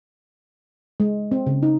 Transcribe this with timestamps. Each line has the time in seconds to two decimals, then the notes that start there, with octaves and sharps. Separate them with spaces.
1.00 G#3
1.32 C4
1.47 C#3
1.63 D#4